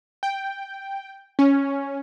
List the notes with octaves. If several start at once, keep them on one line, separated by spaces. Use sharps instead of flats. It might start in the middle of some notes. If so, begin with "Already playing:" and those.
G5
C#4